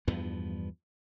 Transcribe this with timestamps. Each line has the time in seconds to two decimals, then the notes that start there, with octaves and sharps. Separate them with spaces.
0.08 E2 G2 F3 B3